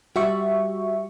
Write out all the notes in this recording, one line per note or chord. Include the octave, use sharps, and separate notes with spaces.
G3 F#4 E5 C#6